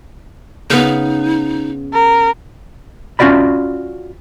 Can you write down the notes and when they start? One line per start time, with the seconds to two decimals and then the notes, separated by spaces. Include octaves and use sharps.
0.70 C#3 B3 D#4
1.93 A#4
3.19 C#4 F4 F#4 D5 B5